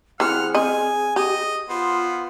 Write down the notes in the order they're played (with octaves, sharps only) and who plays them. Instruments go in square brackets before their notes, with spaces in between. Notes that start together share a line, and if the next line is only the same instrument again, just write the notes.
[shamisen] E3 C4 [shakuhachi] G#4 [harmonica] F#5 F6
[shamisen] C4 D#5 [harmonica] G#5
[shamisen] G4 [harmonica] D#5
[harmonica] B3 C5 [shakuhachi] F4